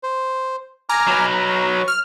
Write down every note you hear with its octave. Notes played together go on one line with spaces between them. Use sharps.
C5
G#5 A#5 D6 F6
F#3 B4
C#6
F6